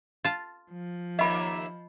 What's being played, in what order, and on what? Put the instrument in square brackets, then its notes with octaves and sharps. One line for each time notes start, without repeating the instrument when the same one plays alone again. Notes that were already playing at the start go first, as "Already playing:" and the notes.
[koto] F4 A5
[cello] F3
[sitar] D#2 A#3 E5 [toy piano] D#5 B5